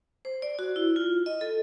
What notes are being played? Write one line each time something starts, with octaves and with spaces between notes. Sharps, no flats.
C5
D5
F#4
E4
F4
D#5
A4